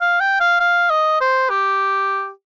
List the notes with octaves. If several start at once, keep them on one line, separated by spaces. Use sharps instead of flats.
F5
G5
F5
F5
D#5
C5
G4